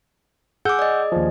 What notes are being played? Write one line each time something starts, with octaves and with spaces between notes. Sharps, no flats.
G#4 F#5 D6 E6 G6
D5 D#5
D#2 F3